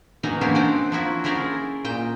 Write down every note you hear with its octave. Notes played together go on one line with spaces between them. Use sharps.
E3 F#3 D#4 F#4 A#4
A#3 C#4 D4 E4 G4 C5
C4 D4 D#4 D5 F#5
F3 F#3 E4 F#4
C#4 E4 G#4 A#4 C5 D5
A#2 D#5 G5